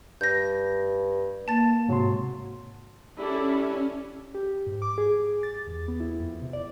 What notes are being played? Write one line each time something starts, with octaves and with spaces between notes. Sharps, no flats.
G2 G6 A#6
A#3 A5 A6
G#2 C3 F#3 C6
G3 C#4 D4 E4 A4
G4
G#2
D6
G#4
A6
E2
B3
E4
F2
C3
D5